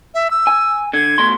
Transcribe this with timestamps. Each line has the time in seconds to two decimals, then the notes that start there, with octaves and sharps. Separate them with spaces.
0.14 E5
0.31 E6
0.47 G#5
0.93 D3 G#6
1.18 B2 A3 C6